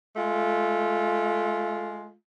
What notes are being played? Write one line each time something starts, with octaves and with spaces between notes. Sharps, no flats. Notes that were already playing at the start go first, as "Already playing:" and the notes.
G#3 A3 F4